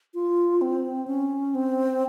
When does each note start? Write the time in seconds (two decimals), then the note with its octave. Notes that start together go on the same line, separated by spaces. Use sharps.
0.14 F4
0.61 C4
1.07 C#4
1.55 C4